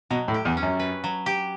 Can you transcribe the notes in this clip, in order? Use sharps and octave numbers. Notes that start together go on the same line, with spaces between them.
B2 F#3
A2
G4
E2
C#4
F#2
B4
F#3
G4